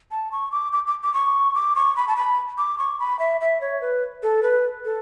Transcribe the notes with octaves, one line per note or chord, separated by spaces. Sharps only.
A5
C#6
D6
D6
D6
D6
C#6
D6
C#6
B5
A5
B5
D6
C#6
B5
E5
E5
C#5
B4
A4
B4
A4